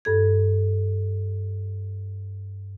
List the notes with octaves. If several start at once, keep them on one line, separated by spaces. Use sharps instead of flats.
G2 A4 G#6